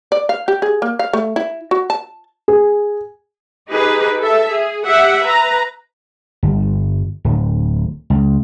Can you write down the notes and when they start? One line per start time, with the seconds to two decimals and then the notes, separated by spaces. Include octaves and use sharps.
0.12 D5
0.29 F5
0.48 G4
0.62 G#4
0.82 A#3
0.99 F5
1.13 A3
1.36 E4
1.71 F#4
1.90 A5
2.48 G#4
3.70 D#4 G4 G#4 B4
4.20 A4 E5
4.54 G#4
4.85 G4 E5 F#5
5.23 B4 A#5
6.43 G1
7.25 D1
8.10 C#2